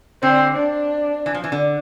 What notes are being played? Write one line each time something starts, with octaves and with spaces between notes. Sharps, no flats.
D3 C4
D4
E3
F3
E3
D3